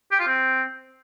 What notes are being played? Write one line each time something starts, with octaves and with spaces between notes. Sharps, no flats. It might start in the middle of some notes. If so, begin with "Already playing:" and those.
G4
F4
C4